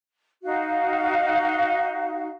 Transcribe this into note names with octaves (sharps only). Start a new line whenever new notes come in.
D#4 F#4 F5